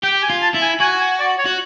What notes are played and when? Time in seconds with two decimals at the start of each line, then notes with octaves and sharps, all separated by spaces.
0.03 G4 G5
0.22 G#5
0.30 F4
0.42 A5
0.54 E4
0.62 G#5
0.80 F#4 G#5
1.00 G#5
1.19 D5
1.38 C#5
1.46 F#4